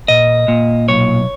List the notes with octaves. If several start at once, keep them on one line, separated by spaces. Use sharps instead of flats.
A#2 D#5
A#2
B1 C#5